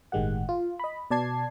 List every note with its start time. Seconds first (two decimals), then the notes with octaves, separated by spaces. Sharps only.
0.12 G1 A2 D#3 G#3 G4 F#5
0.49 F4
0.79 D#5 B5
1.11 B2 D5 A5 G#6 C7